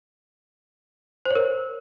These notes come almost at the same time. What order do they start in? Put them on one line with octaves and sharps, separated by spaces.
C5 C#5 A#4